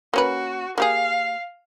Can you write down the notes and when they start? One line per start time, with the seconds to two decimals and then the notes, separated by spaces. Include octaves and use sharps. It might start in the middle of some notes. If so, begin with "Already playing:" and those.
0.14 A#3 C#4 F#4 B4
0.78 A#3 G4 G#4 F5